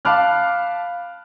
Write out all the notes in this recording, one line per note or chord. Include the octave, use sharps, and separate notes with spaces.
F5 A5 B5 D6 F6 F#6